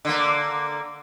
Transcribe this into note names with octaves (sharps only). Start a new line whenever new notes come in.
D3 A#3